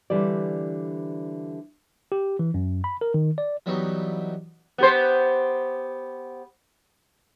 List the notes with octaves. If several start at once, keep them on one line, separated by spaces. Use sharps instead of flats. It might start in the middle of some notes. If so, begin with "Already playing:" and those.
D3 E3 G3 C5 D5
G4
E3
F#2
B5
A#4
D#3
D5
E3 F#3 G3 B3 D#4 F#4
B3 G4 C5